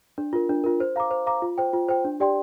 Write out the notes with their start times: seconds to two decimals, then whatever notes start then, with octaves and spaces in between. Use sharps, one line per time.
0.18 D4
0.33 F4 A#4
0.49 D4
0.64 F4 A#4
0.80 C5
0.96 F5 A#5 D6
1.11 C5
1.26 F5 A#5 D6
1.42 F4
1.58 C5 G5
1.73 F4
1.89 C5 G5
2.05 D4
2.20 G4 D5 G5 C6